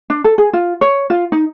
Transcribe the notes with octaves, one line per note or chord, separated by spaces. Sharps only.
D4
A4
G#4
F4
C#5
F4
D#4